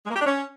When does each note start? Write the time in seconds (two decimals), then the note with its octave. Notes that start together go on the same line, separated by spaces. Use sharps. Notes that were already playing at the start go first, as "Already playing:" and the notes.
0.05 G#3
0.11 A#3
0.16 G4
0.21 D4
0.26 C#4